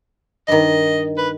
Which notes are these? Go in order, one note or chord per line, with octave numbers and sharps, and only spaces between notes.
G2 D#3 D#5
B4